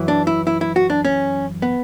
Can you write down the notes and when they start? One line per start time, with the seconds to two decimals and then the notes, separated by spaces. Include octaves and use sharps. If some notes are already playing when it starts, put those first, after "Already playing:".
Already playing: F#2 E3
0.08 D4
0.27 E4
0.47 E4
0.61 E4
0.76 F#4
0.90 D4
1.05 C#4
1.62 B3